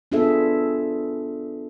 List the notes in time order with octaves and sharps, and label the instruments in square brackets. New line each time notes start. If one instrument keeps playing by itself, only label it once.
[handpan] B3 D4 F4 G#4 A4 E5